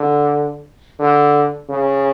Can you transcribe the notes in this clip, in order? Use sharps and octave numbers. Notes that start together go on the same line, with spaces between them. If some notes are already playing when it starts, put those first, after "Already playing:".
Already playing: D3
D3
C#3